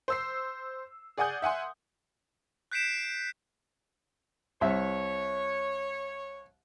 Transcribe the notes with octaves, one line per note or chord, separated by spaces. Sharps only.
C5 E6 C7
G#4 D5 F#5 G#5 D#6 G6
E5 F#5 G#5 C6
F#6 G6 B6 C7 D7 E7
C2 C#5 E5